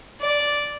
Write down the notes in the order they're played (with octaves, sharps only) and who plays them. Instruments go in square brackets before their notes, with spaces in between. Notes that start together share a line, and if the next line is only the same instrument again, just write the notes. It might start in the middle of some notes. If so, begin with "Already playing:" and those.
[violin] D5